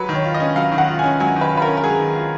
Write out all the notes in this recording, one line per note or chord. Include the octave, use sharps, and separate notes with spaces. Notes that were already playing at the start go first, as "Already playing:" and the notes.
Already playing: F#3 B4
D#3
C#5
F4
D#5
C#4
F#3 F5
D#3
F#5
F4
C#4 G#5
F#3 G#5
D#3
B4
F4
B4
A#4
C#4
A#4
F#3 G#4
D#3
F4